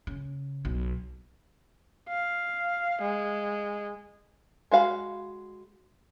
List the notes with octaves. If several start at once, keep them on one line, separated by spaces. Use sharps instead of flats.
C#3
B1
F5
G#3
G#3 F#4 F5 A#5 B5